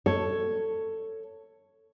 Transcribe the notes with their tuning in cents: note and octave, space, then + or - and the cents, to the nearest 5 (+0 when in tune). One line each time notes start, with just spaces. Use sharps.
A4 +15 C#5 +0